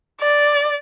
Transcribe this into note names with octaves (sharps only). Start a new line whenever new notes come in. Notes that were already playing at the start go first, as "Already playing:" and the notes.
D5